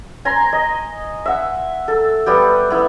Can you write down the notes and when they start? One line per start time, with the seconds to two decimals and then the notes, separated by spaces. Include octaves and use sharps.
0.25 G#5 A#5 C6
0.53 D#5
1.25 E5 F#5
1.88 A4
2.26 G3 B3 G4
2.70 B3 E4